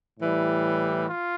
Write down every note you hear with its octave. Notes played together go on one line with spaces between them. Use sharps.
A2 E3 G3
F4